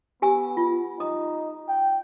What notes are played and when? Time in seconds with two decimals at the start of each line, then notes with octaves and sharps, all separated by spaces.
0.22 B3 G4 G#5 E6
0.57 F4
1.00 D#4 D#6
1.69 G5